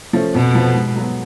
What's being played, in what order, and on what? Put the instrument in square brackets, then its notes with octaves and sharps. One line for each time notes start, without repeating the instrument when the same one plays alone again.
[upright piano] F3 A3 C#4
[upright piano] F2 [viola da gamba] B2
[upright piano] F3 B3
G#2
F#3 B3